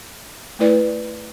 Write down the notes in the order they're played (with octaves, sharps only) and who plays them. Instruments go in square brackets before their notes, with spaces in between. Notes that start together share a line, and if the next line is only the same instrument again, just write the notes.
[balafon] A3 E4 B4 D5